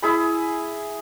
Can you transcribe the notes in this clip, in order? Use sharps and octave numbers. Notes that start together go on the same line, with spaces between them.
E4 G#4 B5